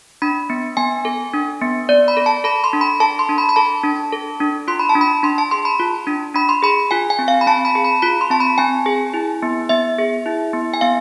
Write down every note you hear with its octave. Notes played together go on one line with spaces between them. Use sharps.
D4 B5
B3
B3 G#5
A4
D4
B3
B3 D5
B5
A4
A5
A4 B5
C6
D4
B5
A4 A5
C6
D4
B5
B5
A4 A5
D4
A4
D4
F4 C6
B5
A5
D4
B5
D4 C6
A5
G#4 C6
B5
F4
D4
D4 B5
C6
G#4 B5
F4 G#5
G#5
C4
F5
B5
C4 A5
B5
G#4
B5
F4 B5
C6
C4 A5
B5
C4 G#5
G#4
E4
B3
B3 E5
G#4
E4
B3
G#5
B3 F5